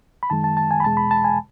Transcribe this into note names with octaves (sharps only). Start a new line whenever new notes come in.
B5
F#2 D#3 G#3 A5
A5
A5
G#5
B5
E2 B2 G#3 A5
B5
A5
G#5